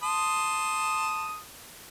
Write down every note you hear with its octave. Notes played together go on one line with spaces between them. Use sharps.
A5 C6 D#6